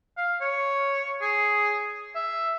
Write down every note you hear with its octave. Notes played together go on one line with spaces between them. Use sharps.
F5
C#5
G#4
E5